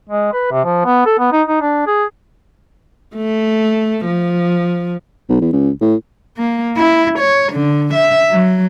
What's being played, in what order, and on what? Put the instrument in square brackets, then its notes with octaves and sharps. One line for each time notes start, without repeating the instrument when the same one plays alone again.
[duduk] G#3
B4
C3
F3
B3
A4
B3
D#4
D#4
D4
G#4
[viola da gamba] A3
F3
[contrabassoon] B1
E2
C#2
A2
[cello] A#3
E4
C#5
D3
E5
F#3